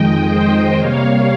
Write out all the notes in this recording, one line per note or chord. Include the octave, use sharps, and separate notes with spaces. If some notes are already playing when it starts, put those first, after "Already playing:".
Already playing: F2 D#3 G#3 D#5 G5
C5 D#5
C3 G3 A#3 C#5 F5